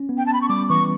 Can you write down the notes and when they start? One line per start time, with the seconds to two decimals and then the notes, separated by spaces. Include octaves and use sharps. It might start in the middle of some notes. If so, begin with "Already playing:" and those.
Already playing: C#4
0.09 B3
0.18 G5
0.26 A5
0.33 B5
0.42 C#6
0.49 G3 D6
0.70 E3 C#6